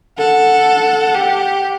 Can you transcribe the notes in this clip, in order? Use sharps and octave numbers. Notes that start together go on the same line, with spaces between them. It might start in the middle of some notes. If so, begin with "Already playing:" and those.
A4 F#5
G4